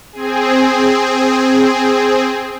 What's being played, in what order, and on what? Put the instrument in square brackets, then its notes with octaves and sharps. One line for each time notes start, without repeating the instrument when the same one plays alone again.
[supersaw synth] C4 G#4